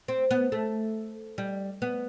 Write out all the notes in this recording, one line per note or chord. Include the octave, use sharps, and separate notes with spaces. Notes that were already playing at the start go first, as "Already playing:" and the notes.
C4
B3
A3
G3
B3